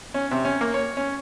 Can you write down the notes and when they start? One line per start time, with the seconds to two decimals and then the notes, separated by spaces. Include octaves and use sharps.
0.14 C#4
0.31 C3
0.45 C#4
0.61 A#3
0.74 C#5
0.97 C#4